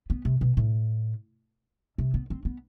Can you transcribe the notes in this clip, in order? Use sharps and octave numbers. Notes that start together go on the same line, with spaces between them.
B3
C3
B2
A2
C3
B3
C4
B3